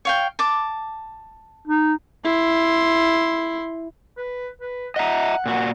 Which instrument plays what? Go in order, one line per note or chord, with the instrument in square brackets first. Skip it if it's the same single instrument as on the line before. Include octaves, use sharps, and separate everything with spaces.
[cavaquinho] C#5 F5 G5
A5 D6
[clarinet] D#4
[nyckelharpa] E4 C6
[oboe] B4
B4
[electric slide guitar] D#5 E5 A#5 [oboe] F#5
[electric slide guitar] A#2 F#4